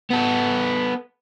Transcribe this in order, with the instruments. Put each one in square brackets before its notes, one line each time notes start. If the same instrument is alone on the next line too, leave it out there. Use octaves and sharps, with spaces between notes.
[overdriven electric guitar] B3 A4